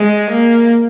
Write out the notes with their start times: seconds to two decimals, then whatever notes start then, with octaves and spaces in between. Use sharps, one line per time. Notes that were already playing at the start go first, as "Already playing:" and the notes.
Already playing: G#3
0.30 A#3